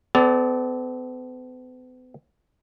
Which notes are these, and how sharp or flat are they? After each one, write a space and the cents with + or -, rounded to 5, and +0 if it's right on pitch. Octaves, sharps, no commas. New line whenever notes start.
B3 +45 A4 -30 D5 +0